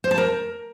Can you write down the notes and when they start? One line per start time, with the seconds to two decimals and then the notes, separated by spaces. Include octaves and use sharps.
0.04 C5
0.11 A5
0.18 A#4